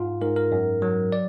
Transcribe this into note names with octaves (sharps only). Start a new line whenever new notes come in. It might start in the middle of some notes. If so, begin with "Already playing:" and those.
Already playing: G#2 F4
G#2 A#4
A#4
F#2
F#3
D5